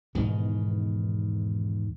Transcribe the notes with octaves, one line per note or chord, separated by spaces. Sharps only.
E2 G#2 B2 D#3